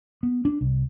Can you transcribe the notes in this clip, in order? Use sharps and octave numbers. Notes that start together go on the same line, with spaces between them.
B3
D4
C2